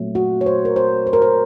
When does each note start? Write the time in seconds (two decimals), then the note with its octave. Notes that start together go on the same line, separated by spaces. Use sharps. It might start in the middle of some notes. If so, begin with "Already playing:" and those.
Already playing: A#2 F#3 A3 C4
0.15 F#4
0.41 C#5
0.46 C5
0.65 A#4
0.76 C5
1.07 C5
1.13 A#4
1.22 C5